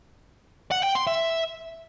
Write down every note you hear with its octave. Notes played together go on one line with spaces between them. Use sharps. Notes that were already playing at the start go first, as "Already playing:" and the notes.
F#5
G5
C6
E5